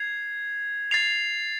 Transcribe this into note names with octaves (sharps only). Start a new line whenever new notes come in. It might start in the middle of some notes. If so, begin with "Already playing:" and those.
Already playing: G#6 C7 F7
A6 C7 F7